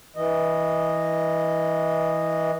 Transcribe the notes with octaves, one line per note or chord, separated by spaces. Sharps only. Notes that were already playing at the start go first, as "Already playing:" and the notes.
E3 D#5